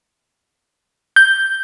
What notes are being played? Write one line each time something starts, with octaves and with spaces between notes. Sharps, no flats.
G6